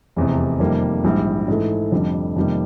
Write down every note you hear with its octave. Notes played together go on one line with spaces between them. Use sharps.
F1 E2 C3
F2 C3 D#3 G3 A#3
A#1 G#2 E3 G3
G#2 E3 A3
F1 F2 D3 G3
F2 C3 D#3 G3 A#3